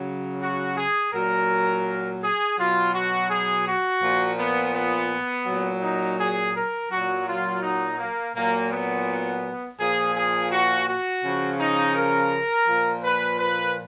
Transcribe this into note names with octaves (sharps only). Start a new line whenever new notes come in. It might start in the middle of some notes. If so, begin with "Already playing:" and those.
Already playing: C#3 F#3
F#4
G#4
A#2 F#3 A#4
G#4
B2 F#3 F4
F#4
G#4
F#4
A#2 F3
B3
B3
A#2 F#3
D#4
G#4
A#4
A#2 F#3 F#4
F4
D#4
A#3
A#2 F#3 A#3
B3
A#2 F3 G#4
G#4
F#4
F#4
C#3 F3
D#4
A#4
A#2 F3
B4
B4